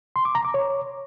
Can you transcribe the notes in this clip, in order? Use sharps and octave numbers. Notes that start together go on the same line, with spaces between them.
C6
D6
A#5
D6
C#5